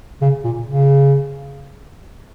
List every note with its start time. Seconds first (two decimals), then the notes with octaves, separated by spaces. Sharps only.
0.21 C#3
0.44 A#2
0.67 C#3